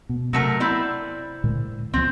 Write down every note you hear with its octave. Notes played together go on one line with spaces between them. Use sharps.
B2
C3 F#3 A3 A#4
C4 E4 D5
A#2 D3 G#3
C#2 F3 C4